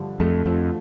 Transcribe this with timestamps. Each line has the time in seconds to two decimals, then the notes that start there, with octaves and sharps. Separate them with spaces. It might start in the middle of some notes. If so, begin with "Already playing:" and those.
Already playing: G2 D3 F3
0.20 F2 A3
0.46 F2 F3